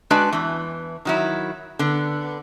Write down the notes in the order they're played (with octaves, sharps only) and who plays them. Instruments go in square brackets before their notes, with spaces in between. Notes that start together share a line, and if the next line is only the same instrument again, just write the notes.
[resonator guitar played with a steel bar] G#3 D4 F#4 B4 D5
E2 E3
D#3 F#3 E4
D3 B3